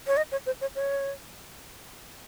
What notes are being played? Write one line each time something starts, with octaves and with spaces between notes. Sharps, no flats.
C#5
D#5
C#5
C5
C#5
C#5